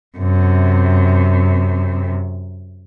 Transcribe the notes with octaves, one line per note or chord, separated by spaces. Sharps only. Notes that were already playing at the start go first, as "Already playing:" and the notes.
F#2 C3